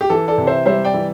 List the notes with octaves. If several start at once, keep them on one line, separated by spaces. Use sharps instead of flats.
G4
E3 A4
A4 D5
C3
C5 E5
G3 C5 E5
D5 G5
E3